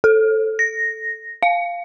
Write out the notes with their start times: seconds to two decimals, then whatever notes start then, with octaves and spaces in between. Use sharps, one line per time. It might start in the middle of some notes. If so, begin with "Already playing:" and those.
0.04 A4
0.59 A#6
1.43 F5